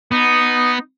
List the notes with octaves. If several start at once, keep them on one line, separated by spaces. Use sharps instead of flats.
B3 D#4